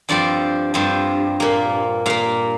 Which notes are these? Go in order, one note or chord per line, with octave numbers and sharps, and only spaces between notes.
G2 F3 C4 D5
G2 F3 C4
A#2 A#3
A#2 A#3 F5